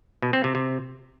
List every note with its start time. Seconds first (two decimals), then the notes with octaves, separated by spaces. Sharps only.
0.22 B2
0.33 C4
0.44 C3
0.55 C3